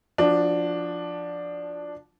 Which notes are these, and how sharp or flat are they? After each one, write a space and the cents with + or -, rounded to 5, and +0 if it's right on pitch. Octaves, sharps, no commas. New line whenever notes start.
F3 +0 D4 +0 F#4 -25